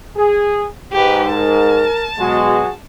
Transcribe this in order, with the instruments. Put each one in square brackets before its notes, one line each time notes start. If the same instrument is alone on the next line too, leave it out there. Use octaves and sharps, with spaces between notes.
[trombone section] G#4
[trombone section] G#2 [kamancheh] G4 B4
[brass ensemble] A#4 [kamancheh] A5
[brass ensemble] B2 G#3 [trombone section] F#3 F#4 G#4